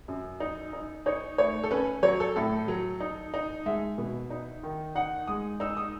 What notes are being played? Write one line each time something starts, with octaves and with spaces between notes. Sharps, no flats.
F#2
D#4
D#4
D#4 C#5
A3 C#5
A4
C#4 B4
F#3 C#5
A4
A2 A4
F#3
D#4
D#4
G#3 E5
B2
D#4
D#3
D#4 F#5
G#3 D#6
D#4 E6
D#6